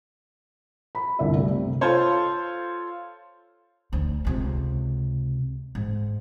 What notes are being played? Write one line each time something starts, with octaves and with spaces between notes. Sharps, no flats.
B5
G1 C2 D3 E4 D5 E5
G3 A3
C3
F4 A4 C5 C#5
D2
C#2 C3
G#2